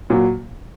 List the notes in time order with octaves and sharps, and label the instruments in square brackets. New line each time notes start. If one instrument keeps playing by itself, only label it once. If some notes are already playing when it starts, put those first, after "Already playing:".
[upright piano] A#2 F#3